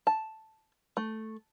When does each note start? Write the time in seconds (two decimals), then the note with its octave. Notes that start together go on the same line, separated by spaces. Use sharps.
0.07 A5
0.97 A3